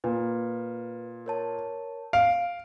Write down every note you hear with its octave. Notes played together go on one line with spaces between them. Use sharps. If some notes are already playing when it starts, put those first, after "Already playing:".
A#2 B4
A#4 C#5 A5
F5 D7